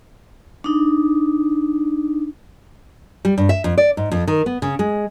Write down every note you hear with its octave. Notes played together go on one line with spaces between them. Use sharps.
D4 D#4
G3
G2
E5
F2
D5
G#2
F2
D#3
B3
C#3
G#3